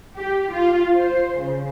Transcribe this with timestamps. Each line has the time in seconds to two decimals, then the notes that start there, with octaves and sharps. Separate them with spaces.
0.17 G4
0.53 F4
0.96 C5
1.38 C#3